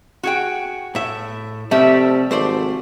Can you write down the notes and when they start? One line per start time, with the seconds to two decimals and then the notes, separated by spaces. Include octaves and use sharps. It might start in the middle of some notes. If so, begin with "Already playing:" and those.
0.23 F#4 G#4 G5
0.95 A2 E5
1.71 C3 F3 G3 A3 E5
2.31 G#1 A3 C5 D5